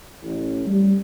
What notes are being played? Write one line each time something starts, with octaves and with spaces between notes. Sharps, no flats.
A1
G3